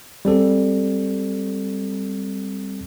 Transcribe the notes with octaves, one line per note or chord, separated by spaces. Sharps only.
G3 C4 A4